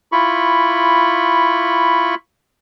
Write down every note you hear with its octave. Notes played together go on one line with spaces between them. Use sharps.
E4 F4 B5 C#6